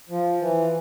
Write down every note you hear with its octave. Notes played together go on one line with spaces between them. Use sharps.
F3
E3